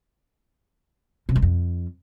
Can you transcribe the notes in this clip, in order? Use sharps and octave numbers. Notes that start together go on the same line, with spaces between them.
C3
F#2
F2